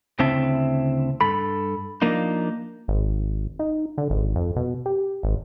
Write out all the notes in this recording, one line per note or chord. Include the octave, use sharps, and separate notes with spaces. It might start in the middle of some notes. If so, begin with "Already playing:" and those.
D2 C#3 C4 E4 E5 A5
G2 A4 B5
F3 A#3 D4 D#4
G#1
D#4
D3
G#1
F2
B2
G4
G#1